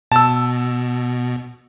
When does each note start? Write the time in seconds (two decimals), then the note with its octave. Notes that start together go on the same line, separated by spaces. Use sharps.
0.12 B2 A5 E6